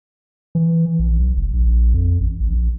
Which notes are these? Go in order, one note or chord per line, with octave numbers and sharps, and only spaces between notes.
E3
A#1
B1
F1
A#1
F2
A1
A#1